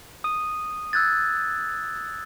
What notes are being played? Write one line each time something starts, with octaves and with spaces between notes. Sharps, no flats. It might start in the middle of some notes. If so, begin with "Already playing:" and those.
D#6 D#7
E6 F#6 G#6 A6